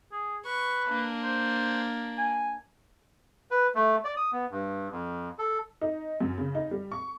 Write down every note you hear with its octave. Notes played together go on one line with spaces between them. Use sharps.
G#4
B4 C#6
A#3 D4
C5
G#5
B4
A3
D5
D#6
B3
G2
F2
A4
D#4
F#2
C#3
D#4
G3
C#6